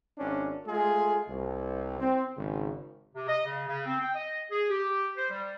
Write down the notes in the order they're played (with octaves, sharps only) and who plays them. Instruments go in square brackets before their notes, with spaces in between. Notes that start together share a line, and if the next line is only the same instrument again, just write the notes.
[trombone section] G#1 C#4 D4
G#3 A3 F4 G#4
C2
C4
G#1 C#3
[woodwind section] C3
D#5
C#3
C#3
C4
G5
D#5
G#4
G4
C5
G3